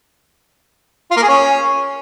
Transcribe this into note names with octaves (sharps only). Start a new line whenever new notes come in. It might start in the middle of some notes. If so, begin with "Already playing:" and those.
F4
A#3
G#4
C#4